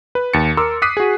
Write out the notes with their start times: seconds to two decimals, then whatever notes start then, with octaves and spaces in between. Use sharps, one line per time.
0.15 B4
0.34 D#2 A6 C#7
0.57 A#4 C6 D6 E6
0.82 D6 D#6 F#6 B6 C7 D#7
0.97 F#4 G#4